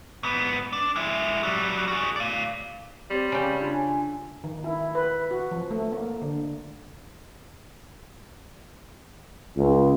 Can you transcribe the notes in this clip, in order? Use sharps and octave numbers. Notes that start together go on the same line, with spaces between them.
G#2 B3
D4
G#3 E4
F#3 G3
F#4 G#4
D5 F5
G3 C4 C#5 C6
C#3 G4 C#5 A5
D4 F4
G#5
D#3
E4
B4
F#4
F3
A3
A#3
D3
C#2